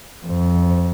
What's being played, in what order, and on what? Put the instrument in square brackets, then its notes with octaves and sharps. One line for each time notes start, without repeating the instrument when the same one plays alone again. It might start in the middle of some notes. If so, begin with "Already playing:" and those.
[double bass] F2